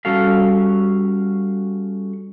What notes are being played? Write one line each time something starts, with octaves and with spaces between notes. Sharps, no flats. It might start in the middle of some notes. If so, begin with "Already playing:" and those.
G3 C#4 F#4 A4 F5